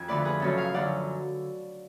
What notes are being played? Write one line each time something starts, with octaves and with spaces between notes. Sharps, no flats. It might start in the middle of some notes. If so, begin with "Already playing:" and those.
Already playing: F2 G#5
D2 D3 F3 B4 D5
G#4 B4
F#2 C#3 F3 A4 C#5
F5 G#5
F#2 D3 F3 D5 F#5